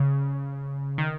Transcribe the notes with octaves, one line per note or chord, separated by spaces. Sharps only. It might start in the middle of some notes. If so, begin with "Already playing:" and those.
Already playing: C#3
D#3